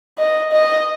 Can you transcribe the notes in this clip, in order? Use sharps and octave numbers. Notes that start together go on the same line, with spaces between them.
D#5
D#5